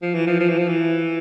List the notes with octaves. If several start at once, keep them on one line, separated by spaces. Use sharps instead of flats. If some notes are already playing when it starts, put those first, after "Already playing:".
F3
E3
F3
F3
E3
F3
E3